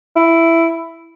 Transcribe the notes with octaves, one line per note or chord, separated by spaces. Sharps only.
E4